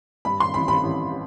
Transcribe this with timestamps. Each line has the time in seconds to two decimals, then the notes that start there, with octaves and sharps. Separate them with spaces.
0.25 G2 B5
0.40 C6
0.54 A1 B5
0.68 B5
0.83 A1